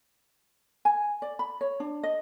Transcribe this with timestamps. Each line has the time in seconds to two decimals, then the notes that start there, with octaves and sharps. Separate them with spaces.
0.85 G#5
1.22 D5
1.39 B5
1.61 C#5
1.80 D4
2.03 D#5